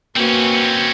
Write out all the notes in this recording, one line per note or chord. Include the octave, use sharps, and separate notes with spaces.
A#3 C4 C#4 F#4 B4